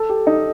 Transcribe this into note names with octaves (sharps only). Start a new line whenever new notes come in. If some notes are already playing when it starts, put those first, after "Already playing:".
Already playing: A4
G4
D#4